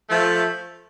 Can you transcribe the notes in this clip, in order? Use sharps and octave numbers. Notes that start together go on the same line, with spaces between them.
F3 A3